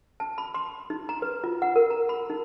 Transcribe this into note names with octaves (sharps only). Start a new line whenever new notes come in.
A5
B5
C6
D#4
A#5
B4
F4
F#5
A#4
A#5
B5
D#4